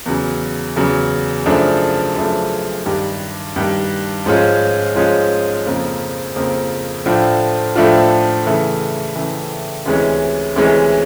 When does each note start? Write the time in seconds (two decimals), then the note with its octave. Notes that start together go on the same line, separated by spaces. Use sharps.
0.06 E2 C#3 F#3
0.76 E2 C#3 F#3
1.46 F#2 C#3 F3 A3 D4
2.16 F#2 C#3 F3 A3 D4
2.86 G2 D#3 G3
3.56 G2 D#3 G3
4.26 G#2 F3 G#3 C#4 F4
4.96 G#2 F3 G#3 C#4 F4
5.66 F2 C#3 F3 A#3
6.36 F2 C#3 F3 A#3
7.06 A2 F3 A3 D4 F4
7.76 A2 F3 A3 D4 F4
8.46 C#3 E3 A3
9.15 C#3 E3 A3
9.86 D2 C3 E3 G#3 C#4
10.56 D2 C3 E3 G#3 C#4